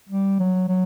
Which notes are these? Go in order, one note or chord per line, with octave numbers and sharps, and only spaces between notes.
G3
F#3
F#3